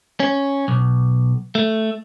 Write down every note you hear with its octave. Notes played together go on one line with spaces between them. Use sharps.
C#4
B1
A3